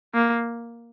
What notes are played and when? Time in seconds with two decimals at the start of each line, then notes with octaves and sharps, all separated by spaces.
0.14 A#3